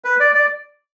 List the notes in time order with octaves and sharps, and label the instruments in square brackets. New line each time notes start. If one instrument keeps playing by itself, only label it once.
[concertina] B4
D5
D5